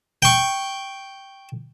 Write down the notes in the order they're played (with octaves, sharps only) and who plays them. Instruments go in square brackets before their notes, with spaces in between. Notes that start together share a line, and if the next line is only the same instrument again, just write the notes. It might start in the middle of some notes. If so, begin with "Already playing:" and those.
[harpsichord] G5 C#6